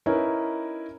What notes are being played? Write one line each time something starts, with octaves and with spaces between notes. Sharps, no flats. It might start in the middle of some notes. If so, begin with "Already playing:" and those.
C#4 D#4 E4 A#4 B4